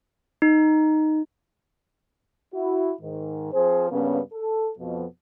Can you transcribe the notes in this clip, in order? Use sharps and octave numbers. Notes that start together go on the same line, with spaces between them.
D#4
E4 F#4
G#2 D#3
F3 C4 G#4 C5
G2 C#3 A#3 B3 C#4
A4
F2 B2 F3